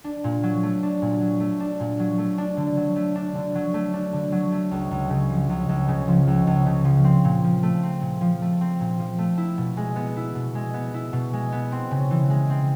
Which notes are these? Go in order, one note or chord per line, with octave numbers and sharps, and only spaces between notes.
D4
A#2
F#3
A3
D4
A#2
F#3
A3
D4
A#2
F#3
A3
D4
D3
F#3
A3
D4
D3
F#3
A3
D4
D3
F#3
A3
C#2
C#2
C#3
F3
C#2
C#2
C#3
F3
C#2
C#2
C#3
F3
C4
A#2
F3
A3
C4
A#2
F3
A3
C4
A#2
F3
A3
E4
B2
G#3
B3
E4
B2
G#3
B3
E4
B2
G#3
B3
C4
C#3
E3
G#3
C4